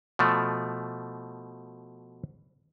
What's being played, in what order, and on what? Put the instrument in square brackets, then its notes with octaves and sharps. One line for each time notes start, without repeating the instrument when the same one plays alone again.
[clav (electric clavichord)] B2 F3 A3